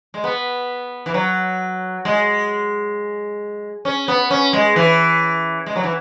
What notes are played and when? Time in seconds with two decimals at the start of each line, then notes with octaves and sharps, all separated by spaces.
0.14 G#3
0.24 B3
1.06 E3
1.14 F#3
2.05 G#3
3.85 C#4
4.08 B3
4.31 C#4
4.53 G#3
4.76 E3
5.66 G#3
5.76 F#3
5.83 E3